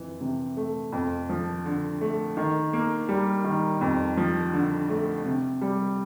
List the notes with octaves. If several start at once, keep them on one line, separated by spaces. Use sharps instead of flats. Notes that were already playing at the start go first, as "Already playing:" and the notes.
Already playing: F2 E3
C3
A3
F2
F3
D3
A3
D#3
A#3
G3
D#3
F2
F3
D3
A3
C3
G3